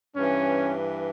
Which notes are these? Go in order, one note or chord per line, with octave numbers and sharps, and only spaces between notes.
G2 E3 C#4